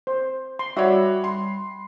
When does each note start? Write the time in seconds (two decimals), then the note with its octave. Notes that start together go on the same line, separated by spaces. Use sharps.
0.07 C5
0.59 C6
0.77 G3 F#4 C#5 D5 E5 B5
1.24 C6